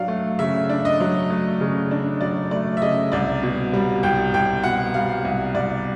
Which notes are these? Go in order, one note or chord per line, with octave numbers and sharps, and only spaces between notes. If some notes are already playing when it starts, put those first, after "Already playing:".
Already playing: F#3 D4 F5
A3
C#3 E5
D4
D#5
F#3
A3
C#3
D4
F#3 D5
A3 D5
E5
C#3 D#5
C2 D5
B2
G3
C2 G5
C2 G5
B2 F#5
G3 F5
C2
C2 D5